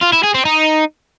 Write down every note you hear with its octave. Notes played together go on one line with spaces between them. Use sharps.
F4
E4
G#4
C4
D#4